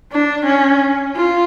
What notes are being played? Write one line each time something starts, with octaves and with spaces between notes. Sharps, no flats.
D4
C#4
F4